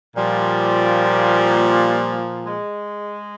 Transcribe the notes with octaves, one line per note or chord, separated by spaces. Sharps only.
A#2 F3 G3
G#3